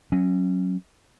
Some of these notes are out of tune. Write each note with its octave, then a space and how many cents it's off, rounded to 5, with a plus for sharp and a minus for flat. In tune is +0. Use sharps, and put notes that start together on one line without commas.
F#3 +0 C#4 -20